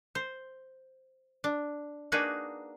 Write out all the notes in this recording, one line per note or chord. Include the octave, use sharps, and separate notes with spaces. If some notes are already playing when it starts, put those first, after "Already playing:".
C5
D4
A#3 D4 D#4 F#4 G#4 B4